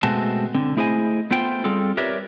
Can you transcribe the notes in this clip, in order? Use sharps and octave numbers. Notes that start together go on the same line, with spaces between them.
B2 G#3 A3 C4 F#4 A5
D3 C4
A3 E4 G#4 C5 D#5 G#5
A3 B3 F4 C5 G5
G3 C4 F4 G#4 A4
G4 A#4 B4 C#5 D5 E5